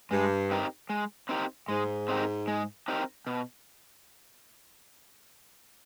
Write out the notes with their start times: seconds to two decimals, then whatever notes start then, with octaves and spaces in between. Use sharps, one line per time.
0.11 G2 G#3
0.51 C4 D#4 G4 A#4
0.90 G#3
1.29 C4 D#4 G4 A#4
1.68 G#2 G#3
2.09 C4 D#4 G4 A#4
2.48 G#3
2.88 C4 D#4 G4 A#4
3.27 B2